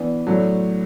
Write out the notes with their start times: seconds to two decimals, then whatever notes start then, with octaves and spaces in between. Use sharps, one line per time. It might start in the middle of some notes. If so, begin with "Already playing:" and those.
Already playing: E3 B3 D4
0.27 A2 F#3 A3 D4